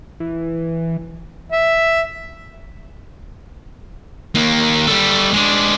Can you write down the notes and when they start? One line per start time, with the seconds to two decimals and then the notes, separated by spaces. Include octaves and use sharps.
0.20 E3
1.52 E5
4.35 D#2 A#3
4.87 G3 A4
5.33 G#3 D4